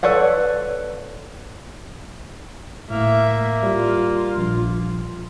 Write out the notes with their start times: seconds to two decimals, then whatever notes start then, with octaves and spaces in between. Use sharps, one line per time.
0.03 A4 B4 C#5 D5 F#5
2.90 A2 A#3 E5
3.63 G3 F4
4.37 A#1